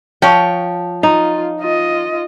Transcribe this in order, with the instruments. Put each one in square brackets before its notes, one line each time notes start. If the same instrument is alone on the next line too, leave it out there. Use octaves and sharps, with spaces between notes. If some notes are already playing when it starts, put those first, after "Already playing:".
[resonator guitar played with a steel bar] F3 C#5 [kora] G5
[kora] D#4 [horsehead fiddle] F4
[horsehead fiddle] F4 D#5